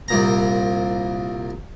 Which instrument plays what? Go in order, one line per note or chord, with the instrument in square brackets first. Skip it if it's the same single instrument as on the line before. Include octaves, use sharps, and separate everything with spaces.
[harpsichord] C2 A#2 A#5